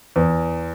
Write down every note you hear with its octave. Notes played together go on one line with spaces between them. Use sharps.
E2